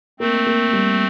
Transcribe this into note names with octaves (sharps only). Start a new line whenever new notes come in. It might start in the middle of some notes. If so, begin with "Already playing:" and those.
A3 A#3 C4
A#3
G3